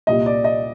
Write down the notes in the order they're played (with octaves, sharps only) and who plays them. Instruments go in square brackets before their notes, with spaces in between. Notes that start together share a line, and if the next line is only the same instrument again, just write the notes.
[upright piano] C2 A#2 G3 D#5
D5
D#5